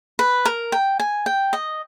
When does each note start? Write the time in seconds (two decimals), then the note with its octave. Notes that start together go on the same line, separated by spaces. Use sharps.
0.19 B4
0.46 A#4
0.72 G5
1.00 G#5
1.26 G5
1.53 D#5